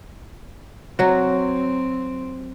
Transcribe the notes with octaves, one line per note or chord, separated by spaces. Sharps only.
F#3 C4 F#4